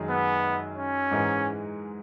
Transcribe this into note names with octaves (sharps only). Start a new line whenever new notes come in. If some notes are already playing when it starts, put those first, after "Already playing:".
Already playing: F#2 D#3 G#3 D#4
B3
C#4
G#2 E3 G#3 D#4 A#4